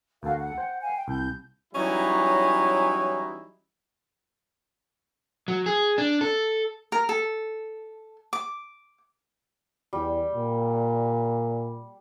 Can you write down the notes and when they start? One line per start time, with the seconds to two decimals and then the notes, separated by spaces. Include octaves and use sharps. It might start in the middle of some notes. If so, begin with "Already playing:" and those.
0.23 D2 F#4 A4 A#4 F5
0.39 F#5
0.58 C5 G5
0.81 F5 F#5 G#5
0.95 G5
1.08 C2 G6
1.74 E3 F#3 G3 C#4 D#4 E4
5.48 F#3
5.66 G#4
5.98 D4
6.21 A4
6.92 A#4
7.09 A4
8.33 D6
9.93 E2 G3
10.35 A#2